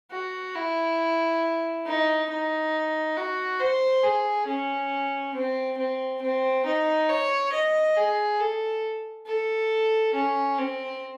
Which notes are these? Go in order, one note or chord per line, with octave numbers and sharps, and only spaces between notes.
F#4
E4
D#4
D#4
F#4
C5
G#4
C#4
C4
C4
C4
D#4
C#5
D#5
G#4
A4
A4
C#4
C4